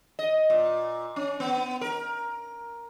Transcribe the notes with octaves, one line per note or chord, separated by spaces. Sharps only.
D#5
A#2
C#4
B3
A#4